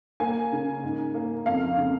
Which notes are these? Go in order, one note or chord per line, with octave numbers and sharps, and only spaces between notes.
A#3 G#5
C#3
G#2
A#3
F2 F5
C#3